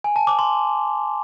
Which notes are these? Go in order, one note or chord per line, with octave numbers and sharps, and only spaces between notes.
G#5
A5
D6
C6